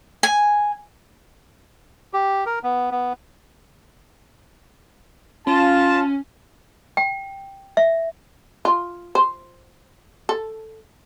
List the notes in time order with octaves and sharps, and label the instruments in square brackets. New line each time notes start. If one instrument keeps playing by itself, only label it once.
[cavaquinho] G#5
[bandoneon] G4
A#4
B3
B3
[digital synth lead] C#4 [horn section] F4 A5
[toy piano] G5
E5
[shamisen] F4
C5
A4